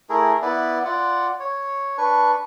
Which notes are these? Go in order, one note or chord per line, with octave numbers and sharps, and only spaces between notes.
A3 E4 G#4 A#4
B3 E4 B4 D5
F4 D5 F#5
C#5
D4 B4 C#6